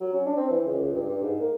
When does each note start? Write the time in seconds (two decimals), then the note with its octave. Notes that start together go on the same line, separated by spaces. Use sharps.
0.01 F#3
0.13 C#4
0.26 D4
0.37 C4
0.50 E3
0.66 C#2
0.80 C#2
0.94 G2
1.09 G2
1.22 G#2
1.39 A#3